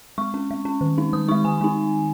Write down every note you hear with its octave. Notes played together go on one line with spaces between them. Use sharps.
G#3 C#6
C#4
G#3
C#4
D#3
G#3 D#4
D#3 D#6
G#3 D#4 C#6
D#3 G#5
G#3 D#4